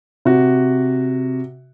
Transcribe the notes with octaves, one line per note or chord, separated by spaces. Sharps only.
C3 F#4